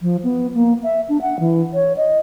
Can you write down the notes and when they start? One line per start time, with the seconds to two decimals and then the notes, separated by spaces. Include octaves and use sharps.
0.02 F3
0.24 B3
0.55 A#3
0.83 E5
1.09 D4
1.22 F#5
1.40 E3
1.74 C#5
1.97 D#5